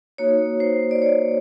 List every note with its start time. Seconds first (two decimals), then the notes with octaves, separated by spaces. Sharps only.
0.18 A#3 D#4 F#4 C#5
0.60 C5
0.91 D5
1.02 C#5